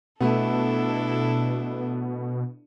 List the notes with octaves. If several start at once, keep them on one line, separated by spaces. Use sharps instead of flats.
B2 A3 B3 D4 E4 A4